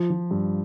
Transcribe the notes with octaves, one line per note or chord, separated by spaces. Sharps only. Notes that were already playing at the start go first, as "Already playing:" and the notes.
Already playing: F3
F3
G2